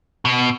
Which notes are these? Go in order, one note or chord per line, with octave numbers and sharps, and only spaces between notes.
B2